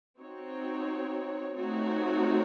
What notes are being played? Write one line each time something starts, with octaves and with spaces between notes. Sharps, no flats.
C4 D#4 F#4 C#5
A3 C4 D#4 F#4 C#5